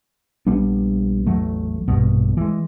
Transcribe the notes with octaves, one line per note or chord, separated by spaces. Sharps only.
A#1 G3 B3 D4
A1 E2 F#3 A3
A#1 G2 B2
E3 G#3